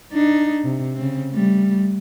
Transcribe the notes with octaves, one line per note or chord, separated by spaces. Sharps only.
D4 D#4
C3
C#3 C4
G3 A3